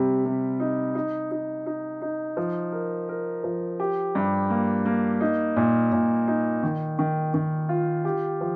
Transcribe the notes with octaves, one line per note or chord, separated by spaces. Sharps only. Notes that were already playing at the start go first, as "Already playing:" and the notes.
Already playing: C3 G3
C3
D#4
D#4
D#4
D#4
D#4
F3
A#4
A#4
F3
G4
G2
A#3
A#3
D#4
A#2
A#2
D#4
D#3
D#3
D#3
F4
G4
F3